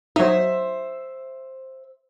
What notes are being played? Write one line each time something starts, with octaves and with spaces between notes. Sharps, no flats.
F#3 D#4 C5 E5